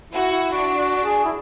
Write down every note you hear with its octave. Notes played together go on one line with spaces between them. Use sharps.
E4 F#4
E4
D4 F#4
F#4
G#4
E4